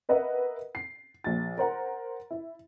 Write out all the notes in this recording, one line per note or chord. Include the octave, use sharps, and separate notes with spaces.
A#4 B4 D#5 E5 F#5
C7
A#1 A6
A#4 C5 F#5 A#5
E4